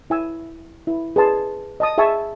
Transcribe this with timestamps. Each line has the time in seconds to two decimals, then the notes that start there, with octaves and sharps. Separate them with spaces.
0.10 E4 G#5 E6
0.87 E4
1.16 G#4 B4 A5 C6
1.80 D#5 A5 D#6
1.98 G#4 E5 G#5 A5 C#6 E6